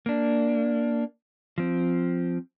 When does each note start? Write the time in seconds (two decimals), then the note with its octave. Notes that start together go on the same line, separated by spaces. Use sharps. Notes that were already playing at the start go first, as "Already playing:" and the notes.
0.06 A#3 D4
1.58 F3 C4